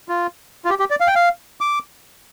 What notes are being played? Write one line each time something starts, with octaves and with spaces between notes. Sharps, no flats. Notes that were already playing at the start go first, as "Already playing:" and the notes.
F4
F4
G4
G4
D5
F5
G5
F5
D6